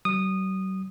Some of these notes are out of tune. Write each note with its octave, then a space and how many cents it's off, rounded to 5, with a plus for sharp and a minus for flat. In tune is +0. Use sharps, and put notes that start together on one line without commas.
F#3 +45 D#6 -15